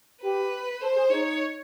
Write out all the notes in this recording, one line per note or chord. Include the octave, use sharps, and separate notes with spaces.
G4 B4
A4 C5
G#4
D#4 C#5